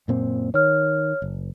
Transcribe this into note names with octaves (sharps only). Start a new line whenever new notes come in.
F#2 A#2 C4
D#3 C#5 F6
F#1